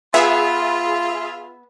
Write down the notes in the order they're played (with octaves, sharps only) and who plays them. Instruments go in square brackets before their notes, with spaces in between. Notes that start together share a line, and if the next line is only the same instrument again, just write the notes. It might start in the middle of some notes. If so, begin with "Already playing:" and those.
[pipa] B3 [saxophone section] F4 [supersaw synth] G#4 E5